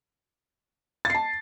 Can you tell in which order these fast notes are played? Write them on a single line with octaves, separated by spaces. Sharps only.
A6 C7 A5